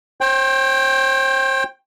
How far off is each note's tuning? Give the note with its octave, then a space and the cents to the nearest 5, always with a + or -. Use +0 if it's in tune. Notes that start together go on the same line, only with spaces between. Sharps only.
C5 +40 G5 +0